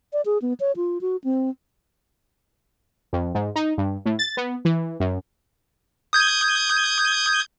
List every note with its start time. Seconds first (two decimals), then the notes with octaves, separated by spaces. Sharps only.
0.13 D5
0.26 G#4
0.42 B3
0.60 C#5
0.76 F4
1.01 F#4
1.24 C4
3.13 F2
3.35 G#2
3.56 D#4
3.78 G2
4.06 A2
4.19 A6
4.37 B3
4.65 E3
5.00 F#2
6.13 D#6 G6 G#6